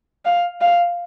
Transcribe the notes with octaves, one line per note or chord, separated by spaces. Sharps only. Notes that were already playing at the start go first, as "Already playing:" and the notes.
F5
F5